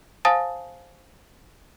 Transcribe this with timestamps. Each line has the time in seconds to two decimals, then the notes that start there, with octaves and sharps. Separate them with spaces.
0.25 C5 F5 G#5 A5 D#6 A6